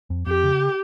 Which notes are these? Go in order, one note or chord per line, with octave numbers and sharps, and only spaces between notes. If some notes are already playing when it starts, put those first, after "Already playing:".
F2
F2 G4
C#3